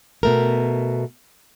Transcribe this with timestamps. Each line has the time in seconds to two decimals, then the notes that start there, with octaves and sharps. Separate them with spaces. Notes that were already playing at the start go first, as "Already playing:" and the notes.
0.23 B2 A3 A#4